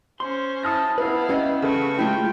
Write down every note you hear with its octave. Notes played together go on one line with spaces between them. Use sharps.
C#4 C5 C6
E4 A5 D#6 F6 A#6
B3 E4 B4 F5
G3 C#4 D#5
C#3 A3 B4 C#6
G#3 A3 E4 F4 G4 G5